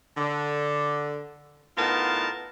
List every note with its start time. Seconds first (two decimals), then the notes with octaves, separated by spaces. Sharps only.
0.17 D3
1.77 A2 B3 D#4 F4 A#4 A5